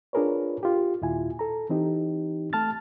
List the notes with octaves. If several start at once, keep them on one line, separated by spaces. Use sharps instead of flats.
D4 F4 G#4 A#4 B4 C#5
F4 G4
D#2 A#2 E4 F4 G#5
A4 A#5
E3 C4 D#4 G4
A3 A5 F6 A6